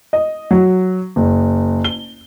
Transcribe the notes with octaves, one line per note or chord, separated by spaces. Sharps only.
D#5
F#3
F#1
G7